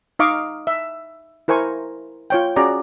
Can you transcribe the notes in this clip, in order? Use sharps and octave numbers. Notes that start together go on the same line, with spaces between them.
D#4 D#5 F5 C#6 D6
E5
E4 A#4 C5 G#5 C#6
F4 C#5 G5
C#4 F#4 G#4 D5 A#5